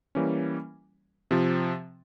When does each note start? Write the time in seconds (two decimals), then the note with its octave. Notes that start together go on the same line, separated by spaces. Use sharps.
0.15 E3 G3 A#3 C#4
1.31 C3 F3